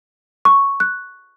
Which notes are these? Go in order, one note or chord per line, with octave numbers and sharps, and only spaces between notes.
C#6
F#6